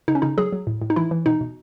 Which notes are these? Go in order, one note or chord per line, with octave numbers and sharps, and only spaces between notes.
C#3 D#4
C#4
C#3 D#4
F#3 G#4
F#3
A2
A2
D#4
E3 E4
E3
B2 D#4
B2